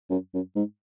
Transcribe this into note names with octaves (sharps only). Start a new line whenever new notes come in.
F#2
F#2
G#2